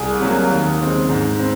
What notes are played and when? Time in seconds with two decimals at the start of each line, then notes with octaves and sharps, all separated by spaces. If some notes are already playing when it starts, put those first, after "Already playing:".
Already playing: C2 G#4 G#5
0.19 C3 F#3 A#3
0.50 D#2
0.79 C#3 G#3 C4
1.09 G#2
1.39 C4